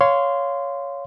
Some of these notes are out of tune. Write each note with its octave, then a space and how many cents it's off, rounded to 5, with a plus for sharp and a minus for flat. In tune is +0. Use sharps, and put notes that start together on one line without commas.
C#5 +10 F5 +0 C6 -15